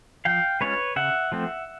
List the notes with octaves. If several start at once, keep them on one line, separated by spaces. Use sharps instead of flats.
F3 F5 G5
G#3 C#4 F4 B4 C#5
C#3 E5 F#5
F3 A3 C4